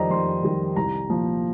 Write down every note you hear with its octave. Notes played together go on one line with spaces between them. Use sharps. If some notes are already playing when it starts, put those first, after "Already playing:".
Already playing: F2 D#3 G3 C5 D5 D#5 A#5
F2 C6
D#3 G3
C2 A#5
A#2 F3